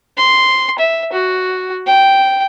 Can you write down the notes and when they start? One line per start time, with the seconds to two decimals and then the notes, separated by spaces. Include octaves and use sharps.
0.17 C6
0.79 E5
1.13 F#4
1.86 G5